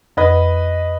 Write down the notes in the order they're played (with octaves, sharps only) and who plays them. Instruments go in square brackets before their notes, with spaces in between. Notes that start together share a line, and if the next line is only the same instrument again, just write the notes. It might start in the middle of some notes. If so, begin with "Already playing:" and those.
[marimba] F2 [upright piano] B4 D#5